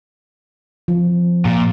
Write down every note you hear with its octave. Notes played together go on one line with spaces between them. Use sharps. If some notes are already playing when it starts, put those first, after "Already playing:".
F3
A#2